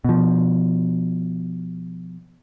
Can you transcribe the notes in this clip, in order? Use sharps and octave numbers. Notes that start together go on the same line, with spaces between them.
B2 F3